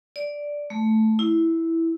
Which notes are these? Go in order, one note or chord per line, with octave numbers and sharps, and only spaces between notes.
D5
A3
E4